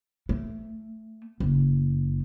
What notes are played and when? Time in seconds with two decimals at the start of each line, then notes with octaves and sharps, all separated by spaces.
0.29 A3
1.40 F#1